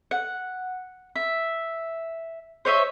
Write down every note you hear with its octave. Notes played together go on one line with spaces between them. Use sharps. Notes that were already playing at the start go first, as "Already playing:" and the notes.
F#5
E5
C5 C#5 D#5 E5